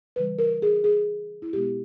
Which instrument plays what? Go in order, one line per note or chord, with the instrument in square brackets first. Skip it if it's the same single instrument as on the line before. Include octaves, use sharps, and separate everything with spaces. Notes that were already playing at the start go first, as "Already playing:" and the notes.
[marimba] C#3 E3 G3 B4
A#4
G#4
G#4
E4
B2 G#3 B3 G4